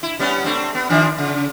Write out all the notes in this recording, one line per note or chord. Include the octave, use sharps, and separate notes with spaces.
E4
G3 B3 C#4
A3 C4 D4
B3
D#3 F3 D4
C#3